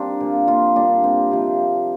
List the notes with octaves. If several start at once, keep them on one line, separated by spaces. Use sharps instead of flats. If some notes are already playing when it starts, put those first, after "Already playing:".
Already playing: G3 C4 D4 F4 A#4
A#2 F3
F4
A#2 G3 D4
C4
C3 F3